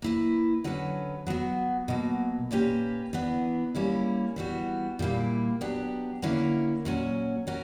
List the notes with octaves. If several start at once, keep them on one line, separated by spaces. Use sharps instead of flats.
A#3 E4 B4
D3 F#3 C#4 F#4 B4
F#3 B3 F#4
B2 F#3 A#3
A#2 A#3 C#4 G4 B4
E3 B3 D4
G3 A#3 C#4 E4
E3 G3 B3 F#4
A#2 G3 A#3 E4
F#3 B3 D4 G4
D3 A#3 C#4 E4 A#4
A#2 F#3 C#4 F#4
F#3 C#4 F#4 A#4